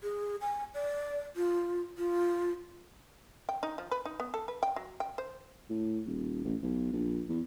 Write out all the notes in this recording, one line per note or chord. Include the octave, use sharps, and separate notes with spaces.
G#4
G#5
D5
F4
F4
G5
D#4
F3
B4
D#4
B3
A4
B4
G5
F#3
G5
C5
A2
D#1
A1
B1
A#1
E2